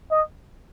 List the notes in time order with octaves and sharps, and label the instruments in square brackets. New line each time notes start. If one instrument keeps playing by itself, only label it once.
[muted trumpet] D#5